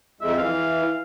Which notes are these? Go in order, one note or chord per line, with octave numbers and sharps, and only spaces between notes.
F2 G#3 E5
E3 F5